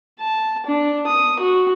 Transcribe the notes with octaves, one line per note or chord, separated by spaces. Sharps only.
A5
D4
D#6
F#4